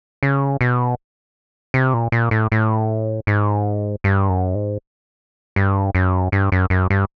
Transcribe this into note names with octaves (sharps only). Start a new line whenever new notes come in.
C#3
B2
C3
A#2
A#2
A2
A2
G#2
G2
F#2
G#2
G2
F#2
G2
F#2
F#2
G2